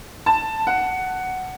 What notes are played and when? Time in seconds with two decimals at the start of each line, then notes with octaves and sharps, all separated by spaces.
0.26 A5
0.67 F#5